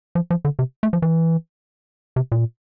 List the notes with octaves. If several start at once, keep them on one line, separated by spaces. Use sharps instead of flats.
F3
F3
D3
C3
A3
F3
E3
C3
A#2